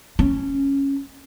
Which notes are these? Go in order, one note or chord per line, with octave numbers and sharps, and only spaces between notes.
C#4